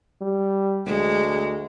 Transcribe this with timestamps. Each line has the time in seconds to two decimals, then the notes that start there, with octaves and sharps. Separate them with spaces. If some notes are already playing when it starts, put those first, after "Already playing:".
0.21 G3
0.86 D2 G#3